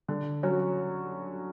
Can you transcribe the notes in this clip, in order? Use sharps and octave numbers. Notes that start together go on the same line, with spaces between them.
D3
F#3 C#4 F#4